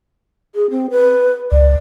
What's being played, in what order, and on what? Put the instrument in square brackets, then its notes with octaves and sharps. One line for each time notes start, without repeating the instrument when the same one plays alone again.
[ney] G#4
C4
B4
[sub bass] C#2 [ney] D5